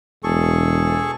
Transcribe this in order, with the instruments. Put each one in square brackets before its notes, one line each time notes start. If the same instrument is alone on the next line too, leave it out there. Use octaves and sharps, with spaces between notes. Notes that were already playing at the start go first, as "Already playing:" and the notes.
[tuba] E1 [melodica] G#4 A4 C#6